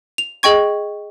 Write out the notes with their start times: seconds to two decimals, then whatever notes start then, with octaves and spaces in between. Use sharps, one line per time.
0.18 F7
0.43 G#4 D#5 G5 C#6 G#6